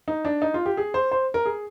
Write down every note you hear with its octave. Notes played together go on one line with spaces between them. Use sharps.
D#4
D4
D#4
F4
G4
G#4
C5
C5
A#4
G#4